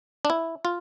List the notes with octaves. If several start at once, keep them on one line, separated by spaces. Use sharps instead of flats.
D4
E4
F4